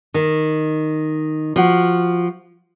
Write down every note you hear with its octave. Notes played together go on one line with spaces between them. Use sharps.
D#3
F3 F#4